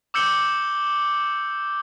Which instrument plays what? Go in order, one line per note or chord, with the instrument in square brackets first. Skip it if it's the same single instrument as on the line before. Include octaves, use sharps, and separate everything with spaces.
[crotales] D6 E6 G6 C#7 G7